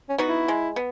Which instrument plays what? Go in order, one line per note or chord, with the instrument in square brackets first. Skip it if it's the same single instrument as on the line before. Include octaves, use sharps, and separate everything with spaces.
[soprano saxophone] C#4
[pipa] B3 D#4 F#4
[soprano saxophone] E4
[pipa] G#3
B3